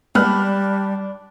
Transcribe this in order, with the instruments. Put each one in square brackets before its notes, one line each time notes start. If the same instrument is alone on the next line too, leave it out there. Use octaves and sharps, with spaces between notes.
[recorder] G3 [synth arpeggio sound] G#3 A#3 B3 [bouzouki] D4 [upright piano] B5 F6 F#6